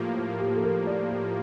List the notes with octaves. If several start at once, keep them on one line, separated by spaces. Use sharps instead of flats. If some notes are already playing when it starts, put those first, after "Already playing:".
Already playing: A2 F3 A#3 F4 G4
F4
G4
A4
A#4
D5
G4